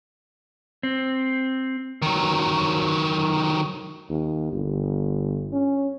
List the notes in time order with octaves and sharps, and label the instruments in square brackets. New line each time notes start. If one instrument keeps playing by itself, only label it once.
[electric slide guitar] C4
[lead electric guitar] D#3 F#3
[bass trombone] D#2
G1
C#4